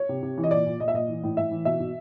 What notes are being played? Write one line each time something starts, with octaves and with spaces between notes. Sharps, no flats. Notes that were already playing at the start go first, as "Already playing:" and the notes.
Already playing: C#5
C3
C3
E3
D#5
A#2 D5
A#2
A#2 D#5
E5
A#2 D#5
E3
A2
A2 E5
E3
B2 E5
B2